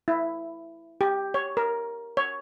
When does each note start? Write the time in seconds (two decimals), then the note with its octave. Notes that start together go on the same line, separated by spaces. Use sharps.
0.08 E4
1.01 G4
1.34 C#5
1.57 A#4
2.17 C#5